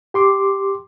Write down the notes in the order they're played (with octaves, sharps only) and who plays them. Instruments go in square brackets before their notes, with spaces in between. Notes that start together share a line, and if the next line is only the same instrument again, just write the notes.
[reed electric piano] G4 C6 D6